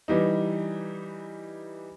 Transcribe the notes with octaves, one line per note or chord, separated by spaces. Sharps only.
E3 G3 D#4